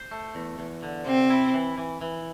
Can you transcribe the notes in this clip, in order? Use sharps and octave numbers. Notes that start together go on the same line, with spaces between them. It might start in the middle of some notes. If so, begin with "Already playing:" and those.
Already playing: C5
A3
E2
E2
D3
C3 C4
E4
E3
E3
E3